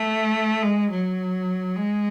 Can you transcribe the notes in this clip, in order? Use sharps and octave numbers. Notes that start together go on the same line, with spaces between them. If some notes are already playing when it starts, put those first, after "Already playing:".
Already playing: A3
G#3
F#3
G#3